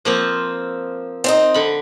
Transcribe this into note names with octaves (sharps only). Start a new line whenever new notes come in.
F3 A#3 C4
C4 D4 D#4
D3 B5